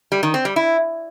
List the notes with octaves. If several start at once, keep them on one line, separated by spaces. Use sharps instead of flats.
G3
D#3
C4
G3
E4